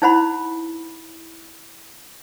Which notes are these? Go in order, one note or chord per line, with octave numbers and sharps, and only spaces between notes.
D#4 E4 C5 F#5 B5 C6